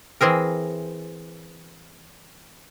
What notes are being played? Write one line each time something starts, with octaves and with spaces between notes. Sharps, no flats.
E3 C4 G#4 A#4